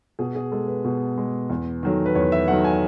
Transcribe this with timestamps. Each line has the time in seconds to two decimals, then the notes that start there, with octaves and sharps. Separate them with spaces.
0.19 B2 G#4
0.35 G#4
0.52 G#3 A4
0.68 B4
0.85 B2
1.17 G#3
1.50 E2
1.83 D#3 F#3 A3
2.06 B4
2.15 E2 C#5
2.32 E5
2.48 D#3 F#3 A3 F#5
2.65 G#5